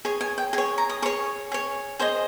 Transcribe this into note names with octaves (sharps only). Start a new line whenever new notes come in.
G#4 C#5
G#5
G5
G#4 C#5 G#5
A#5
D#6
G#4 C#5 C#6
G#4 C#5
G#4 C5 D#5